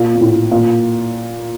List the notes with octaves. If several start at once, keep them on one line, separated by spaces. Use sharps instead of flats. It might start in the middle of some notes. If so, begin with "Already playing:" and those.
Already playing: A#2
A#2
A2
A#2